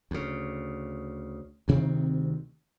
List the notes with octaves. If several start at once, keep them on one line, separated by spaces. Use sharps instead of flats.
D2 C#3
D2 C3 D#3 C4